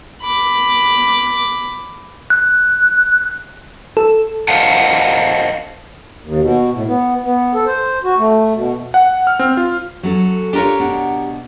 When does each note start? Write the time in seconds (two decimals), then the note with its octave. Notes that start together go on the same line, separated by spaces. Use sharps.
0.23 B5 D6
2.30 F#6
3.97 A4
4.48 A#4 C5 D#5 F5 F#5 A5
6.22 D#2
6.40 B2
6.72 A2
6.87 B3
7.24 B3
7.54 A4
7.67 C5
8.04 F#4
8.18 A3
8.55 B2
8.94 F#5
9.27 F6
9.39 C4
9.57 F4
10.03 F#3 C#4 A4
10.53 D4 F4 G4 A#4 C#5
10.80 B2 D4